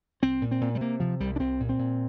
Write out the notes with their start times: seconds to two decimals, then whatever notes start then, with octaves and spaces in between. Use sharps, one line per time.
0.22 C2 C4
0.41 A#2
0.51 C4
0.61 A#2
0.75 G3
0.81 C3 A#3
1.00 C3 F3
1.20 C2 G3
1.36 D4
1.39 C2 C4
1.60 A#2
1.69 C4
1.79 A#2